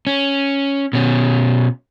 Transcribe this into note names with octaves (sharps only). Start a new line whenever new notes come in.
C#4
B2 C#4